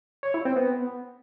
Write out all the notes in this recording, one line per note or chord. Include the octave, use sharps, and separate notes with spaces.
C#5
E4
C4
B3